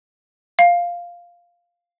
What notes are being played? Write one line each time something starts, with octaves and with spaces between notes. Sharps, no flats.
F5